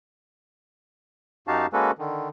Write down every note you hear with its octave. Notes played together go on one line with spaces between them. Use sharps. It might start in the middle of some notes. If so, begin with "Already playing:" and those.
F#2 D#4 F#4 G4 F5 A5
G#3 A#3 C#4 F#4 A4 B4
D3 D#3